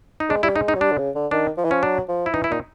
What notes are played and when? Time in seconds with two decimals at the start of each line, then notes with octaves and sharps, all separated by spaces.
0.20 D#4
0.30 G#3 D4
0.43 G3 E4
0.56 G#3 D#4
0.68 D#4
0.75 F#3
0.81 G3 D4
0.92 D3
0.98 C#3
1.15 D3
1.31 D#3 D4
1.57 F3
1.64 E3
1.71 F3 C#4
1.83 F#3 D4
2.09 F3
2.26 E4
2.34 E3 D#4
2.44 E4
2.50 A#2 D#4